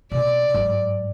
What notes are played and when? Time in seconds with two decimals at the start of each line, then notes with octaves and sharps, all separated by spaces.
0.12 B2 D5
0.54 G#2 F#3 D4